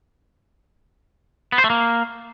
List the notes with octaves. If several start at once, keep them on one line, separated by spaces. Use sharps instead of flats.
B3
C5
A3
A#3